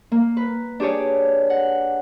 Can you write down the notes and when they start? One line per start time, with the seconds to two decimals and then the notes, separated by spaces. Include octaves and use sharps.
0.12 A#3
0.37 B4
0.80 D4 G4 G#4 C#5 D5
1.50 F#5